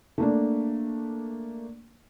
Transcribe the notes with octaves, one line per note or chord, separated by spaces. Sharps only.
A3 A#3 D4